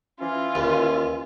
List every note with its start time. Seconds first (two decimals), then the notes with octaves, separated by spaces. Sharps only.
0.20 E3 C#4 F4
0.55 D#2